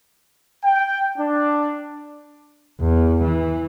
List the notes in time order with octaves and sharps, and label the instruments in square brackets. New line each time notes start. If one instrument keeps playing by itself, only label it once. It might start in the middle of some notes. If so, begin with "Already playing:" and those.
[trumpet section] G5
D4
[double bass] E2
E3